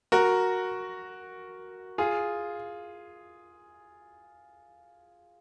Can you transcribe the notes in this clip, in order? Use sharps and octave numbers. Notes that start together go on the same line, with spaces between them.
F#4 A#4
F4 G#4